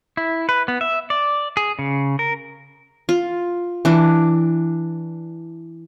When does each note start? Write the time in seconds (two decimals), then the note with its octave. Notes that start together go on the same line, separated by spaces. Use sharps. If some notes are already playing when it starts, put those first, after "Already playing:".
0.17 E4
0.49 B4
0.68 B3
0.81 E5
1.10 D5
1.57 G#4
1.79 C#3
2.19 A#4
3.09 F4
3.85 E3 D4